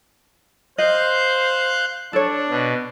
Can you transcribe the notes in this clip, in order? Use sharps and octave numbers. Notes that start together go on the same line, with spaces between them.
C5 D#5 F5 F#6 G6
D4 A4 C#5
B2